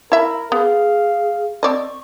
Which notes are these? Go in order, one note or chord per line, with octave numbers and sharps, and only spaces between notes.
E4 A#4 E5 B5
B3 G#4 F5
C4 D5 D#5 C#6